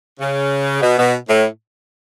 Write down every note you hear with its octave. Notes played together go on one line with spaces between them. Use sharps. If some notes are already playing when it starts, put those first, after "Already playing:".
C#3
B2
B2
A2